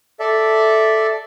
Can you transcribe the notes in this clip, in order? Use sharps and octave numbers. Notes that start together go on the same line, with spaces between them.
A4 D5 E5